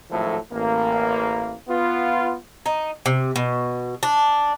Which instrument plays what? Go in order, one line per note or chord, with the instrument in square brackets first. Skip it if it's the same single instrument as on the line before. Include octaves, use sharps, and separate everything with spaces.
[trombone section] G#1 A2 F3 F#3 A3 A4
A1 A#3
B3 F4
[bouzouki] D#4
C3
B2
D4